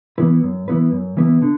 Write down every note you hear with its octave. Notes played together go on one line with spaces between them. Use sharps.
E3 B3 E4 B4
F#2
E3 B3 E4 B4
F#2
E3 B3 E4 B4
D3